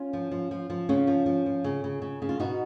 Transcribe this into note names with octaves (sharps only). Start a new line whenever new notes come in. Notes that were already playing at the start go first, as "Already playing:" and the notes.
Already playing: C#4 F4
F3
F3
F3
F3
C#3 C#4 F4
F3
F3
F3
C#3
C#3
C#3
C#3
F4
B2 D#4 F#4